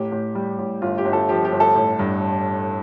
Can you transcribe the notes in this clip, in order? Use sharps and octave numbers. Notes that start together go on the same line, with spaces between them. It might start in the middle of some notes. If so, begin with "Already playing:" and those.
Already playing: A1 G4
A1
G3
A1
G1 F4
G4
G1
A4
F3 G4
G4
G1
A4
A1
G2